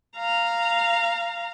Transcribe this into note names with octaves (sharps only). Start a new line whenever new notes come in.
F5 A#5